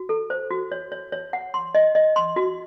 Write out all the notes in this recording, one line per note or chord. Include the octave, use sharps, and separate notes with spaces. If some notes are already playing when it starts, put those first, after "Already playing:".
Already playing: F#4
A4
C5
F#4
C#5
C#5
C#5
F#5
C6
D#5
D#5
C6
F#4